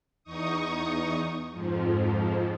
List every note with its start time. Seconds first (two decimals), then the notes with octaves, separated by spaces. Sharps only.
0.24 E2 D#4 C#6 D#6
1.52 F2 G#2 F3